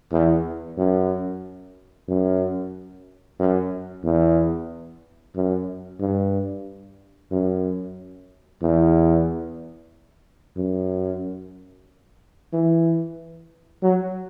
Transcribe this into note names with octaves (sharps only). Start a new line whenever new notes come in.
E2
F#2
F#2
F#2
E2
F#2
G2
F#2
E2
F#2
E3
F#3